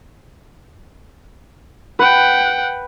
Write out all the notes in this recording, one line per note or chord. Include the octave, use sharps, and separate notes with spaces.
B4 F#5 G5